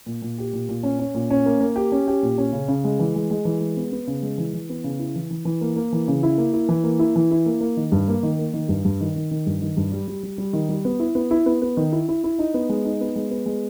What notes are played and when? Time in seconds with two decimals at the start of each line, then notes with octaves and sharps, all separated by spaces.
0.06 A#2
0.22 A#2
0.38 G4
0.53 A#2
0.69 A#2
0.83 C#4
0.99 C#4
1.14 A#2
1.30 C#4
1.46 A#3
1.61 A#3
1.76 G4
1.92 C#4
2.08 G4
2.23 A#2
2.38 C#4
2.53 C#3
2.68 C#3
2.84 G#3
2.99 E3
3.15 G#3
3.31 G#3
3.45 E3
3.61 G#3
3.77 B3
3.92 B3
4.07 C#3
4.22 G#3
4.38 E3
4.53 E3
4.69 B3
4.84 C#3
4.99 E4
5.16 E3
5.31 E3
5.45 E3
5.61 A#3
5.76 A#3
5.93 E3
6.08 C#3
6.23 E4
6.38 A#3
6.53 E4
6.69 E3
6.84 A#3
6.99 E4
7.16 E3
7.31 E4
7.46 A#3
7.61 A#3
7.77 D#3
7.92 G2
8.08 A#3
8.23 D#3
8.39 A#3
8.54 D#3
8.69 G2
8.85 G2
9.01 D#3
9.16 D#3
9.31 D#3
9.46 G2
9.62 D#3
9.77 G2
9.92 G3
10.08 G3
10.23 G3
10.38 G3
10.53 D#3
10.69 G3
10.85 B3
10.99 E4
11.15 B3
11.31 E4
11.46 B3
11.62 B3
11.77 D#3
11.92 E4
12.08 E4
12.24 E4
12.38 D#4
12.54 B3
12.69 G#3
12.84 D#4
13.01 B3
13.16 G#3
13.31 B3
13.46 G#3